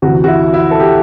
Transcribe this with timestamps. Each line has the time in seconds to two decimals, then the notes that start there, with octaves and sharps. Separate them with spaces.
0.02 D2 C3 E3 F#4
0.24 F#4
0.28 E4
0.54 E4
0.71 A4
0.80 G4